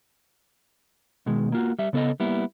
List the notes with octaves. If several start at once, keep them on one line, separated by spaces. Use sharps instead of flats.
B2 D#3 G#3
A#3 F4 F#4
G3 E5
C#3 B3 A4 D5 D#5
G3 A#3 B3 E4